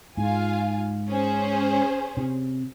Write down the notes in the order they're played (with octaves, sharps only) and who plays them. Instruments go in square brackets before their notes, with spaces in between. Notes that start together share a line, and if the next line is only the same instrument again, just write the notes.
[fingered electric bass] G#2 [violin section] F4 F5 G#5
[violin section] C#4 G#4 C5
[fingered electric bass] C3